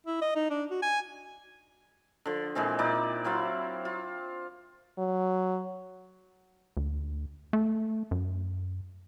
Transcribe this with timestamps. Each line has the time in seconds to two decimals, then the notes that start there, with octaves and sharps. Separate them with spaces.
0.06 E4
0.22 D#5
0.35 D#4
0.50 D4
0.71 F#4
0.82 G#5
2.26 D3 F3
2.55 A#2 E3 G#3 C4
2.79 A#2 D#4 E4 D5
3.24 F#3 C4 E4 F4
3.85 F4
4.98 F#3
6.77 D2
7.53 A3
8.11 F#2